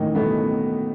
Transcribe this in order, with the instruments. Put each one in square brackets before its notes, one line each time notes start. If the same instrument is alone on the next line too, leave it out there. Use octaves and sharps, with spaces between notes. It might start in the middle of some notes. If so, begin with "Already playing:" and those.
Already playing: [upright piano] A1 A2 D#3 E3 D#4
B2 A3 B3